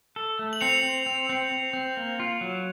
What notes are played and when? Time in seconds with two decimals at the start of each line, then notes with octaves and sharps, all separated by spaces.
0.16 A4
0.39 A3
0.53 F#7
0.61 C4 C#7 F7
0.83 C4
1.06 C4
1.29 C4
1.51 C4
1.73 C4
1.97 A#3
2.20 F4
2.41 F#3